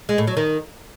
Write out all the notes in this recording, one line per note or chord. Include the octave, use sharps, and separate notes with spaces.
G#3
A2
F#3
D#3